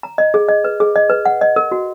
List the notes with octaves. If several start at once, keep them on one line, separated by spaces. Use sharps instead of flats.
A#5
D#5
G#4
D#5
B4
G#4
D#5
B4
F#5
D#5
A#4
F#4